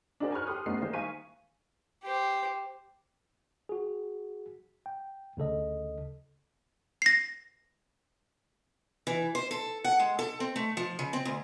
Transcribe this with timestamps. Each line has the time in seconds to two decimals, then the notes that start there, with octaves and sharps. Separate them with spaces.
0.20 D4 D#4 F#4 G#4 A#4 C5
0.32 G#5 B5 C#6 F6 F#6
0.47 G4 A4 C6 D#6
0.66 A3 B3 C#4 D#4 G4 C7
0.81 D#3 G3 G#3 A#3 C5
0.93 E5 F5 G#5 C#6 B6 D#7
2.04 G4 C5
3.69 F#4 G#4
4.86 G5
5.37 D2 C#3 A4 D#5
7.02 A#6 C7
9.07 E3
9.35 C5
9.51 A4
9.84 F#5
10.00 G#3
10.19 A4
10.40 C4
10.56 A3
10.77 F3
10.99 C#3
11.13 C4
11.25 D2